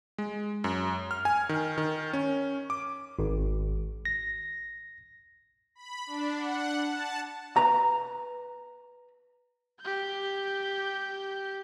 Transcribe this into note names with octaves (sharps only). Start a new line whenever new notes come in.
G#3
F#2
F6
G#5
D#3
D#3
C#4
D6
G#1
A#6
B5
D4
F#5
A5
B4 A#5
G4 G6